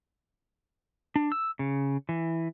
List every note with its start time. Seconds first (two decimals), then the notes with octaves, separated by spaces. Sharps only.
1.16 D4
1.32 E6
1.59 C#3
2.09 E3